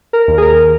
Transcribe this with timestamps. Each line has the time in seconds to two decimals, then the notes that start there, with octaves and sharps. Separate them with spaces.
0.13 A#4
0.28 D#2
0.38 G#4
0.42 A#4